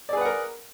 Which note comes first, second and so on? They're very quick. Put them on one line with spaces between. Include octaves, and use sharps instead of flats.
D5 G#4 B4 F#5 A#4